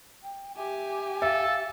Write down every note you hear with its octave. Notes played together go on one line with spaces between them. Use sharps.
G5
G4 E5 G#5
A4 E5 F5